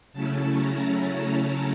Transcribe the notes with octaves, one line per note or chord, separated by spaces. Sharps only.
C#3 F#3 A3 C#4 E4 A5
A#5